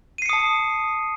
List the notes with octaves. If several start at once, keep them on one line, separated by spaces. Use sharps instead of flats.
A5 D#6 C7 C#7 D#7